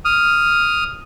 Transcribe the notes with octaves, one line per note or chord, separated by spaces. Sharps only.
D#6 F6